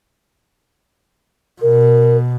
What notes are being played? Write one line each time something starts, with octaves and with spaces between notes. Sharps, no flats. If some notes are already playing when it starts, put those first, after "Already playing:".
B2 A#4